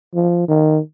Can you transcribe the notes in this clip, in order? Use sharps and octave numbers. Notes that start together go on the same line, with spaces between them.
F3
D#3